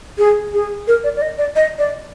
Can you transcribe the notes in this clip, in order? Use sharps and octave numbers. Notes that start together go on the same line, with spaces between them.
G#4
G#4
A#4
D5
D5
D#5
D5
D#5
D5